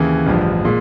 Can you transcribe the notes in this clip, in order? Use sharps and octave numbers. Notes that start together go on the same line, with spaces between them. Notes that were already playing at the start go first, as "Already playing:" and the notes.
Already playing: D#2 C#3 E3 G#4
A1 G2 D3 F3
A#2 G#3